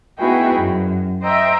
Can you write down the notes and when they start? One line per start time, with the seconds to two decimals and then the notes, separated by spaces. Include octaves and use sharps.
0.18 B3 D#4 E4 F#4 G#4 G5
0.56 F#2
1.23 C5 D#5 E5 G5 A#5